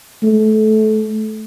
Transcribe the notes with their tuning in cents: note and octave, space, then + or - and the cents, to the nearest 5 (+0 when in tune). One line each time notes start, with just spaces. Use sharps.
A3 -25